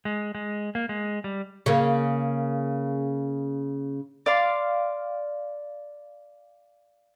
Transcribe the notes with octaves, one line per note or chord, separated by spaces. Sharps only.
G#3
G#3
A#3
G#3
G3
C#3 A#3
D5 F5 C6